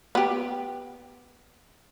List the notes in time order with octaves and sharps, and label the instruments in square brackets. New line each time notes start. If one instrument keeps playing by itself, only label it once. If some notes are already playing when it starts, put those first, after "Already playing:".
[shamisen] B3 G4